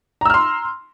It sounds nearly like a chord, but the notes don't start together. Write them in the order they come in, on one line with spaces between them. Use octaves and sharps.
A#5 E6 F6 C6